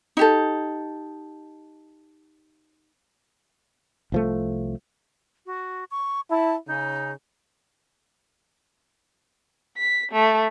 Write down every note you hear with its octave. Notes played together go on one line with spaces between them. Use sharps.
D#4 G4 A4
C2 F3 A3
F#4
C#6
E4 A5
C#3 D#4
B6
A3